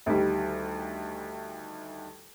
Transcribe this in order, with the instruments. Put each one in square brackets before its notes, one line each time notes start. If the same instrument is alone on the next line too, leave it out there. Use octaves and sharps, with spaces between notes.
[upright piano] D2 D#3 G3